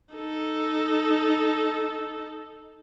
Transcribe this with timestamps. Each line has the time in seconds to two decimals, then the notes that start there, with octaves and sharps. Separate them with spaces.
0.15 D#4 A4